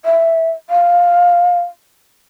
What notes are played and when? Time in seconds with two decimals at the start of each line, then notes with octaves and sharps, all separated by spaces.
0.05 E5
0.70 F5